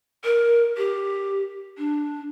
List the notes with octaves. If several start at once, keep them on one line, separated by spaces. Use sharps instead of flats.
A#4
G4
D4